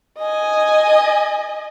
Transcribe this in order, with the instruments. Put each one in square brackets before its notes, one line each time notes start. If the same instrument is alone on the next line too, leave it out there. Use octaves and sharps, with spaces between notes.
[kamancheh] D#5 G#5